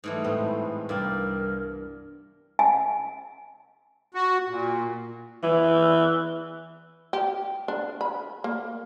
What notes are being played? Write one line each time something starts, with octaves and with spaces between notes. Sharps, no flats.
G#2 E3 G3 A3
A2 G#3 B3 C4
C2 G2 A#4 D5 F5 G5
G#5
F#4
A#2
E3
G4
D4
B5
A#3